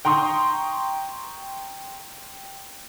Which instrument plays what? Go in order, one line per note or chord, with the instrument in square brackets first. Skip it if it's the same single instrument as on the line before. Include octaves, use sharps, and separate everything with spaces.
[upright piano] G5 A#5 C6 C#6 D#6